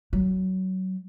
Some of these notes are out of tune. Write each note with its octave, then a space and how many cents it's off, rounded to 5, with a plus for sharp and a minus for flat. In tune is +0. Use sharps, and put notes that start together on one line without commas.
F#3 +20